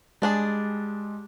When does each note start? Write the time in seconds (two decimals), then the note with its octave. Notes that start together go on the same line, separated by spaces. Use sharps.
0.22 G3 G#3 D4 G#4